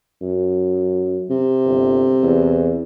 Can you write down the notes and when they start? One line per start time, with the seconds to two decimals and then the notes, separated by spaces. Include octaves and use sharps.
0.22 F#2
1.30 C3
1.65 G1
2.23 E2